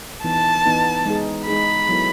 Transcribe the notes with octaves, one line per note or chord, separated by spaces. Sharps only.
E3 B3 D#4 A5
E3 B3 D#4
G#3 D#4 G#4
G#3 D#4 G#4 B5
F#3 B3 E4 A4